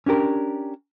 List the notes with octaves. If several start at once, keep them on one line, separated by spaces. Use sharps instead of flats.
C#4 D4 G4 A#4